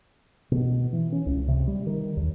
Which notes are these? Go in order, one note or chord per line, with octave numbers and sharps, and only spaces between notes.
B2
E3
C#4
C#2
C3
G3
D#3
D#2